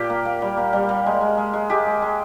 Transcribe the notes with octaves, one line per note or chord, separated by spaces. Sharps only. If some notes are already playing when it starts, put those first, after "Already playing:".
Already playing: A#2 G4
A#3
A#3
G3
A#3
G3
A#3
G#3
G#3
G#3
G#3
G#3 G4
G#3
G#3